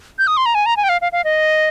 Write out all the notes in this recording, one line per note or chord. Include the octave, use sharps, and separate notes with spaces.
G6
D#6
C6
A#5
G#5
A#5
G#5
G5
F5
F5
F5
D#5